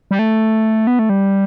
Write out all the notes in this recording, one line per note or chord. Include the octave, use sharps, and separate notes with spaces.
G3
A3
B3
A3
G3